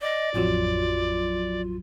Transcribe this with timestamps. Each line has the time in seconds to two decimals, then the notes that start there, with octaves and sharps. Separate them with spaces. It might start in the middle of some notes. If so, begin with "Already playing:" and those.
0.01 D5 D#5
0.34 A1 F2 F#3 F4